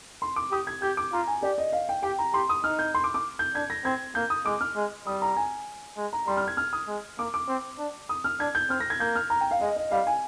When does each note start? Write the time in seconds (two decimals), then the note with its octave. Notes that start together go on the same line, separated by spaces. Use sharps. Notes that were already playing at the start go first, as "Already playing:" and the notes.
0.22 C6
0.36 D6
0.52 G4 D#6
0.67 G#6
0.82 G4 G6
0.97 D6
1.13 F4 A#5
1.27 G#5
1.43 G4 D5
1.58 D#5
1.73 F5
1.89 G5
2.03 G4 G5
2.19 A#5
2.34 G4 C6
2.49 D#6
2.64 D#4 F6
2.79 G6
2.94 C6
3.04 D6
3.14 D6
3.39 G6
3.55 D4 G#6
3.70 A#6
3.85 C4 G#6
4.15 A#3 G6
4.30 D#6
4.46 G#3 D6
4.61 F6
4.76 G#3
5.07 G3 D#6
5.22 A#5
5.36 G#5
5.97 G#3
6.13 A#5
6.27 G3 C6
6.37 F6
6.48 G#6
6.57 F6
6.73 D#6
6.88 G#3
7.19 A#3 D6
7.34 D6
7.48 C4
7.79 D4
8.09 D#6
8.24 F6
8.40 D4 G#6
8.55 G6
8.69 C4 F6
8.80 A#6
8.90 G#6
9.00 A#3 G6
9.16 F6
9.30 A#5
9.41 G5
9.51 F5
9.60 G#3 D#5
9.76 D#5
9.91 G3 F5
10.07 G#5